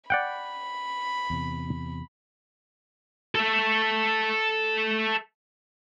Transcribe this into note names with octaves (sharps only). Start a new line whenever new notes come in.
D5 F#5 G5 B5
E2 C3
A4 E5